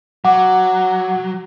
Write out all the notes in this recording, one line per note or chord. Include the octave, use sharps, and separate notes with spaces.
F#3 F#5 D6